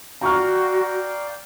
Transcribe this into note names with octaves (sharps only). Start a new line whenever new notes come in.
F#4 D5 F5 G5 A#5 C#6 F6